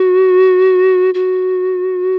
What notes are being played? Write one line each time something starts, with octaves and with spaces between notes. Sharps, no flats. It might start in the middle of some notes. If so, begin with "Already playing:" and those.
Already playing: F#4
F#4